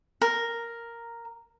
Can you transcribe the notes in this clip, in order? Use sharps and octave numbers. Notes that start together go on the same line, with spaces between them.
A#4